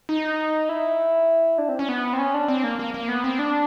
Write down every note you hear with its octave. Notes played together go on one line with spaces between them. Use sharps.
D#4
E4
D4
C4
C#4
B3
C4
C#4
D4
C4
A#3
A#3
A#3
B3
C4
D4